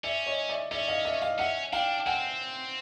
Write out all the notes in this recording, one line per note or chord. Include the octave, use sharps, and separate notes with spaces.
C#4 D5 E5
C#5 D#5
D5 E5
C#4 D5 E5
D#5 F5
D5 E5
D#5 F5
C#4 E5 F#5
D4 F5 G5
C4 F#5 G#5